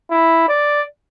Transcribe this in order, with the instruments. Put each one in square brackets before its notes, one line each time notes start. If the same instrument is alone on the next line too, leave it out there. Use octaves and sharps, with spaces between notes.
[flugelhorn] E4
D5